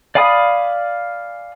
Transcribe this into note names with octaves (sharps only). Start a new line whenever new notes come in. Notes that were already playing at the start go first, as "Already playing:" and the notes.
D5 F5 G#5 B5 D#6